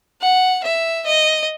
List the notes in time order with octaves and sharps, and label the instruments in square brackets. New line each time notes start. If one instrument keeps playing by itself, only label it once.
[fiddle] F#5
E5
D#5